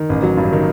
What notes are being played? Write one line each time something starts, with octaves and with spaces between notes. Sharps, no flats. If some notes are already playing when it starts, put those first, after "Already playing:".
Already playing: D#3
A1
F#3
G2
D#3